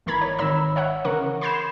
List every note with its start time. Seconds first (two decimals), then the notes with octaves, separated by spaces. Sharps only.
0.06 G#1 E3 A#4 A#5 B5 G#6
0.21 C#5
0.39 G#1 D#3 C#5 A#5 B5 E6
0.76 C#5 E5 F#5
1.05 C#3 E3 A#4 F#5 C#6
1.41 B5 C6 G6 G#6 C7 E7